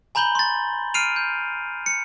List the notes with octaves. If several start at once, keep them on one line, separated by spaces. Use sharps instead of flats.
G#5 A#5 B5 G6 F#7 G7
C6 A6
F6 C7 D7 D#7 F7
G6
C#7